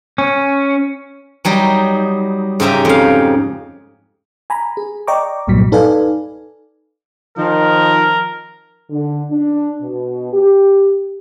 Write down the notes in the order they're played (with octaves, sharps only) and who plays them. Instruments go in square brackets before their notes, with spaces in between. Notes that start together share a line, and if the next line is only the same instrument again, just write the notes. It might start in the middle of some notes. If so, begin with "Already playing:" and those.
[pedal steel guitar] C#4
[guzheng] F#3 G3 D#4
G#2 C#3 G4 E5 A#5
F2 F5
[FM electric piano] G#5 A#5 B5
G#4
D5 D#5 G5 A#5 C#6 D6
C2 G2 A#2 F#3 B6
D#4 A4 B4 D5 F5 G#5
[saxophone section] D#3 F3 [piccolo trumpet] A#4
[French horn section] D3
D4
B2
G4